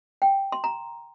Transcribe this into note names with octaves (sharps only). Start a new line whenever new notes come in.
G5
C6
A#5